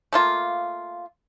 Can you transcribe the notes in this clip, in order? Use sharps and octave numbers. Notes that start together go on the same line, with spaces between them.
A3 A#3 F4